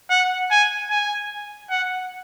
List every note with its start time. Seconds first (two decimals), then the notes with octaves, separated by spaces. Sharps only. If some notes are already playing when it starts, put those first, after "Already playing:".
0.10 F#5
0.51 G#5
0.90 G#5
1.70 F#5